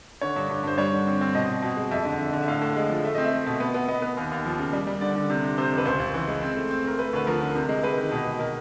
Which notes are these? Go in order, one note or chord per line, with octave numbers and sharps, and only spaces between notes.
D3 C#5
G2
G2
G2 C5
G3 C#5
D3
C4
C4
B2 D#5
B2
B2
G#3
F2 E5
D3
F2
D3
E5
A2 F5
A2
G#3
F3
A3 E5
C4 D#5
E5
A3
B2
B3
B3
B3 D#5
B3
D#2
D#2
F3
C#3
G3
G3
D3 D5
D3
C3
C3
C3 C5
F2
B4
C#2 C5
C#2
E3
G#3
C4
A3
C4
A3 A#4
A3 B4
D2 B4
F3 A#4
D3
C3
G#3
G#3 B4
D#3
B2
G#3
B2 A#4